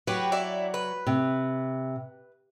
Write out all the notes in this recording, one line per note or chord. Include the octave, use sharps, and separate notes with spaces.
F#3 F#4 G4 B4
E4 D5
B4
C3